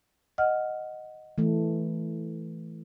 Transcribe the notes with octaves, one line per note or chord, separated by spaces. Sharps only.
D#5 F#5 F6
E3 A3